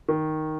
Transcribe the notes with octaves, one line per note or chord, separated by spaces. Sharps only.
D#3